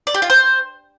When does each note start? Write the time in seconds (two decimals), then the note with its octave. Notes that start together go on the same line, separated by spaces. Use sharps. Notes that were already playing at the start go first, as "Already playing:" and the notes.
0.07 D5
0.14 G4
0.22 F4
0.30 C5